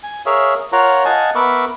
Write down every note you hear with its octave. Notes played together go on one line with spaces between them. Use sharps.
G#5
G#4 A#4 C#5 E5 F5
F4 A#4 C#5 F5 F#5 A#5
D#5 F5 F#5 G#5 A5
B3 A#4 E5 B5 C#6 D6